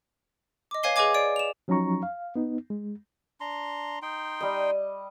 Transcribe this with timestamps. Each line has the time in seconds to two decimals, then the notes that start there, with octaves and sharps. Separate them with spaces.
0.71 D#5 D6
0.83 B4 C#5 F5 G#5 C7 G7
0.96 G#4 B4 D#5 G#5 D6 G#6
1.14 D5 D7
1.36 E7 F7
1.68 F3 F#3 C#4 D#4 A#5 C#6
2.03 F5
2.36 B3 D#4
2.70 G#3
3.41 D4 A#5 C6
4.02 D#4 G5 C6
4.41 G3 D#5